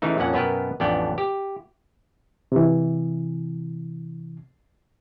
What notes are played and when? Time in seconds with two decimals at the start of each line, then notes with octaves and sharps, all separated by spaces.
0.02 C#3 E3 A3 D#4
0.18 F2 A#2 C#4 F#5
0.33 F#2 B2 B3 A#4 B4 G5
0.80 A1 F2 B3 D4 D5 G5
1.18 G4
2.52 C3 E3